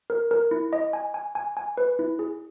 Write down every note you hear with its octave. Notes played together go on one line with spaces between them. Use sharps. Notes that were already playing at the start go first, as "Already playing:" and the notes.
A#4
A#4
E4
D#5
G#5
G#5
G#5
G#5
B4
E4
G#4